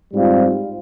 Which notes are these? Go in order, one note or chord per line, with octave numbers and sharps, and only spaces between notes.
G#2 G3 C4 F4